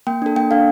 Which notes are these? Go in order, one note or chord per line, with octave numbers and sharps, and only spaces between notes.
A#3 G5
D4 A4
A#3 G5
D4 A4 F5